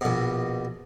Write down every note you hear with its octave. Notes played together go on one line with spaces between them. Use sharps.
A#1 B2